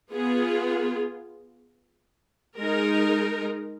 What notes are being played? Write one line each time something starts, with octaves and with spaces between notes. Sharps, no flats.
B3 F4 G#4
G#3 D#4 A#4